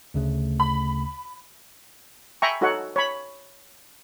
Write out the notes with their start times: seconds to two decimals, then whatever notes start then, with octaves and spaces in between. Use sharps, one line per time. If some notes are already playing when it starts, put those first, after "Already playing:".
0.14 D2 C#3 A3
0.60 B5
2.42 E5 G5 G#5 A#5 B5 C#6
2.61 D#4 F#4 A4 C#5 F#5
2.96 C#5 B5